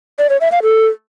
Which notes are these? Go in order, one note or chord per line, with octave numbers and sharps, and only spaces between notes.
D5
C#5
E5
F5
A4